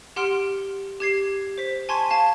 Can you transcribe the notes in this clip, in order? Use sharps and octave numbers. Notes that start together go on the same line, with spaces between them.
G4 F#5 C6 F6 D7 G7
G4 G#6 C7
C5 B6
G#5 A5 C6 C#6 G#6
F5 A5